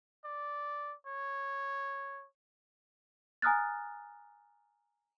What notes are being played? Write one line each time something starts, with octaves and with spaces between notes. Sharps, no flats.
D5
C#5
G#5 A#5 D#6 F6 F#6 A6